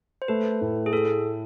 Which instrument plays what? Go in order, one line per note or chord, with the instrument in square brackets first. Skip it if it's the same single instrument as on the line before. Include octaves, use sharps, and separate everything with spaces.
[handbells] C5
[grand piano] A3 [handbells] B4
[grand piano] A2
[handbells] G#4
[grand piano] A3 [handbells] A4